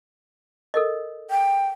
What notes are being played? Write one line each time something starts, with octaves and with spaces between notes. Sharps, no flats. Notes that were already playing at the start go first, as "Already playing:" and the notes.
A4 A#4 D#5
G5